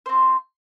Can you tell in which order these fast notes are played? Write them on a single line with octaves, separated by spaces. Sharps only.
C5 C4 F4